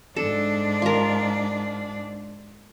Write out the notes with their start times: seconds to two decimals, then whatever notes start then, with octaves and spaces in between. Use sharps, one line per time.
0.16 G#2 D4 A4
0.82 F4 A#4